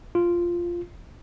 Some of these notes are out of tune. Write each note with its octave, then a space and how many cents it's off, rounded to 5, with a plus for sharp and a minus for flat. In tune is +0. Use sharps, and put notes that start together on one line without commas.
F4 -5